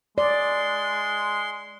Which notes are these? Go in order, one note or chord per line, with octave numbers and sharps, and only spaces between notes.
G#3 D5 C6